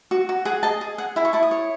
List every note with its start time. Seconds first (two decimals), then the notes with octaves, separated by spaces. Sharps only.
0.11 F#4
0.29 F#4
0.45 G#4 F#5
0.63 D#5 A5
0.81 G#4
0.98 G#4 F#5
1.16 E4 G#5
1.25 C#6
1.33 E4 A5
1.43 D#6
1.51 C#5